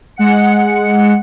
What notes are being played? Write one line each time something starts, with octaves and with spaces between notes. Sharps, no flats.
G#3 F#5 C#7